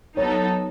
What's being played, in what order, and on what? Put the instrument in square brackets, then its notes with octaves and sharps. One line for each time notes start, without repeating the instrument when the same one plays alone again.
[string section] F#3 B3 D#4 A4 [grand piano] C#5